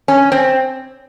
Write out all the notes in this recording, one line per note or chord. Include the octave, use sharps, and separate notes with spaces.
C#4
C4